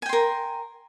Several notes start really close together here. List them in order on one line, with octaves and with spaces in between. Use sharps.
G#5 G5 C6 A#4